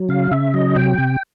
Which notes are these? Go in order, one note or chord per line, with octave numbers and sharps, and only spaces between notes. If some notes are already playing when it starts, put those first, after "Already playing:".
Already playing: F#3
C#3 F5
C#3 E5
F#3 D#5
C3 G5
C3